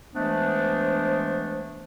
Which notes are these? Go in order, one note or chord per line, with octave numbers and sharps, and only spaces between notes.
E3 G#3 A3 B3 D4 C5